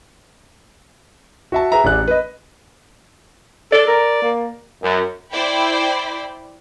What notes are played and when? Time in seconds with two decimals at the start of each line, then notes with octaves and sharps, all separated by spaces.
1.52 F#4 E5 A5
1.72 G#4 B4 E5 A#5
1.84 A1 D4 G#4 F#6
2.08 B4 D#5
3.72 A4 D5
3.87 A#4
4.22 A#3
4.83 F#2
5.33 E4 C5 D5 G5 B5